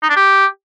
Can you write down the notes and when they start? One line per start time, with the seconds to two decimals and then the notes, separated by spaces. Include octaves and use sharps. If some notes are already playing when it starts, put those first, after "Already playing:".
0.03 D#4
0.10 D4
0.16 G4